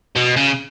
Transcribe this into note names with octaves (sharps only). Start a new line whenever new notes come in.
B2
C#3